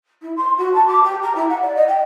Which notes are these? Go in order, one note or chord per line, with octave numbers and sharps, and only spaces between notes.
E4
C6
F#4
A5
D6
G4
A#5
E4
F#5
D5
D#5
G5